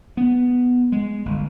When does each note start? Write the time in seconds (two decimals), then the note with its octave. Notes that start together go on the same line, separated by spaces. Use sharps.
0.17 B3
0.92 G#3
1.26 G1